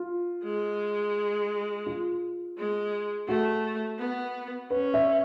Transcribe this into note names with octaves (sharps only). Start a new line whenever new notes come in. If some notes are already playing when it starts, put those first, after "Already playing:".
Already playing: F4
G#3
F4
G#3
A3 F#4
B3
C#4 B4
E5